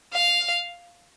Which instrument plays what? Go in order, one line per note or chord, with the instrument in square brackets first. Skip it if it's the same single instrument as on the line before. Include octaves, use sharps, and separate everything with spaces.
[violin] F5